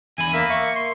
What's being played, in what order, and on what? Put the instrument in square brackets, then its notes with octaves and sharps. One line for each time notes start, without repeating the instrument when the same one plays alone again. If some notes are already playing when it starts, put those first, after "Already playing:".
[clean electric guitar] E2 D3 B5 [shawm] G#5
[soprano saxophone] A#3 [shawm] E5
[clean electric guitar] E5 [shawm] C#6
[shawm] C6